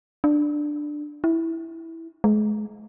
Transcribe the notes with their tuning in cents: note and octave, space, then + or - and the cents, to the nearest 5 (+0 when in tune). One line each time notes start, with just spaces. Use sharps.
D4 +10
E4 -5
G#3 +35